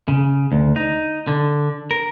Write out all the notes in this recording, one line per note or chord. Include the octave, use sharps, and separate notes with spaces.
C#3
D2
D#4
D3
A#4